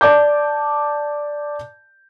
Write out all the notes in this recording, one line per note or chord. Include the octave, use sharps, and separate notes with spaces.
D5 A5 D6 G6